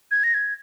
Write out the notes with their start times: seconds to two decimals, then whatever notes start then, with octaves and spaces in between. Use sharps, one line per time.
0.11 G#6
0.24 A#6
0.34 G#6